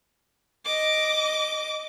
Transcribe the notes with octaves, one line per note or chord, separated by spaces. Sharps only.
D#5 D6